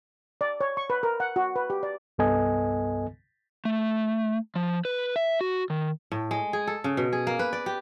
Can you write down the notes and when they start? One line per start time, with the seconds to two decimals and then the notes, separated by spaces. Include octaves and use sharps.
0.41 D5
0.61 C#5
0.77 C#6
0.90 B4
1.03 A#4
1.20 F#5
1.36 F#4
1.56 B4
1.70 G4
1.83 D5
2.18 C2 G2 B3 A4 D#5 G#5
3.65 A3
4.56 F3
4.85 B4
5.16 E5
5.41 F#4
5.70 D#3
6.12 A2
6.31 G#3
6.53 G#4
6.67 A4
6.84 C#3
6.97 B2
7.13 G#4
7.27 A#3
7.39 B4
7.53 D5
7.66 G4